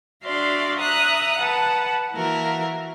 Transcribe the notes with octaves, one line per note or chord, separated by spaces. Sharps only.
D4 F#4 D5 E5 F5 C6
E5 A#5 D#6 F#6
B4 F#5 A5
E3 A#3 F#4 A#4 E5